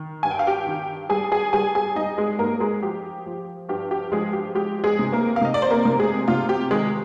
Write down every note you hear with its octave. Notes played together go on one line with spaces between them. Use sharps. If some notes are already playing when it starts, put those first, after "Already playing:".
Already playing: D#3
G2 G#5
G5
F5
G4 G5
D#3
G3 G#4 G#5
G#4 G#5
G3 G#4 G#5
G#4 G#5
G3 D#4 D#5
G#3 G#4
G#2 A#3 A#4
G#3 G#4
F3 G4
F3
G2 G4
G4
F3 G#3 G#4
G4
G#3 G4
G#3 G#4
C3
A#3 A#4
F5
C3 D#5
D5
C5
A#3 A#4
C3
G#3 G#4
C3 F4
G4
D#3 G#3 G#4